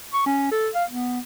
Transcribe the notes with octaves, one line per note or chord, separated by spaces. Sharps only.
C#6
C#4
A4
F5
B3